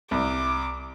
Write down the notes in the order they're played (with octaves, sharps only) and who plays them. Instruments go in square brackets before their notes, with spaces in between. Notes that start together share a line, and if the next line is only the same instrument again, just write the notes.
[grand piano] C2 [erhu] D6